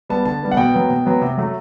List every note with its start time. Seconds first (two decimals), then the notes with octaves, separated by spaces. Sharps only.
0.10 G3 B3 A5
0.25 D3 A5
0.42 G3 B3
0.51 F#5
0.57 B2 G5
0.74 F#3 B3
0.90 B2
1.06 F#3 B3
1.22 C3
1.37 F#3 A3